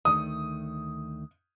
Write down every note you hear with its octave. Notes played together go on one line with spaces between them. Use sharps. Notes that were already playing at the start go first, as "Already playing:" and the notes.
D2 D#3 A3 D#6